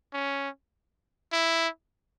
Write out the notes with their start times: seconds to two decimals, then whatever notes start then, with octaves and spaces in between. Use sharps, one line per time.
0.13 C#4
1.32 E4